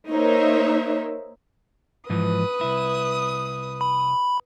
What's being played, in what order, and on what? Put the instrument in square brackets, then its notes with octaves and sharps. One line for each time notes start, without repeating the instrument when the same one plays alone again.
[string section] A#3 D#4 A#4 C5 C#5 E5
[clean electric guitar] G#2 E3 F3 [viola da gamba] B4 [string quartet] D#6
[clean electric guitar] C2 E4
[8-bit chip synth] B5